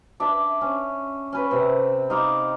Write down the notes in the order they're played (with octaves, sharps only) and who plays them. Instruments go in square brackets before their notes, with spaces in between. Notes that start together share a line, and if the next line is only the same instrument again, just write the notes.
[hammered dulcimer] D4 E5 D6
C#4
C#4 B4
C3 C4
D#4 F5 C6 D6